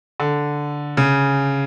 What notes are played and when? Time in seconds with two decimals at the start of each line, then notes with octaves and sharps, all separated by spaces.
0.20 D3
0.97 C#3